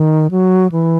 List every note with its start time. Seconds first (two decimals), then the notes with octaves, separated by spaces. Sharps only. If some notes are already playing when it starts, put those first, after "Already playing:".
Already playing: D#3
0.31 F#3
0.72 E3